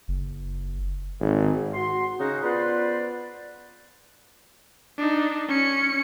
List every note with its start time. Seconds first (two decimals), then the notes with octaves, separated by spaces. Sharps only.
0.08 F#1
1.20 G#1
1.73 F#4 C6
2.19 C#3 C#4 D#4 F#4 G#4
2.43 B3 F4 B4 C5 D5
4.98 D4 D#4
5.48 C#4 C#7